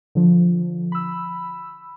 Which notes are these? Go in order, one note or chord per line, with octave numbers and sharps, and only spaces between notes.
D3 F3
B5 E6